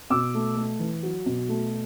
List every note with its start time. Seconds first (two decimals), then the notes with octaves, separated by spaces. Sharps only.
0.10 B2 D6 E6
0.34 A3
0.57 A3
0.80 E3
1.03 F#3
1.26 B2
1.49 A3